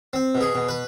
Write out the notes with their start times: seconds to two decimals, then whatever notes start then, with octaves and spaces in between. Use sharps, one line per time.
0.13 C4
0.35 B2
0.41 G#4
0.55 B2
0.69 B4